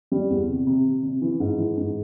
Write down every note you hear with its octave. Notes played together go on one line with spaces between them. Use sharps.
G3
E2
C3
C3
C3
C3
E3
G#2
E3
G#2